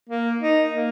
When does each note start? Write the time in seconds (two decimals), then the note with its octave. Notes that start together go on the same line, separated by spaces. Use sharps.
0.10 A#3
0.41 D#4
0.73 A#3